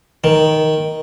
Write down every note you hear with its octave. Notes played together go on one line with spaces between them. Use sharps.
D#3